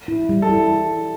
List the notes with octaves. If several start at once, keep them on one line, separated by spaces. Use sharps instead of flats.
E4
G3
A4
E4